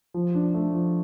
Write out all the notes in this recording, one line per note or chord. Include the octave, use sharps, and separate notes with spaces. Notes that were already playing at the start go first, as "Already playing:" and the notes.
F3
D4
A3
F3